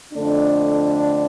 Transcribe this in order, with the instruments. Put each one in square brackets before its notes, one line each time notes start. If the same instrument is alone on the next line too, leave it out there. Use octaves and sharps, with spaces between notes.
[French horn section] F2 D3 A3 D4